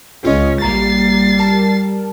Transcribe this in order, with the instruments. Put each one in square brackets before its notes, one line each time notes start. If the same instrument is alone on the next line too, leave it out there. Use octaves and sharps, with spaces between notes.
[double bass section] C#2 [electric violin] C#4 [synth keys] F4 G#4 D#5
[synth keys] A1 A#3 A#5 [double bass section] G3 [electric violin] A6 C7
[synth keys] A#4 A5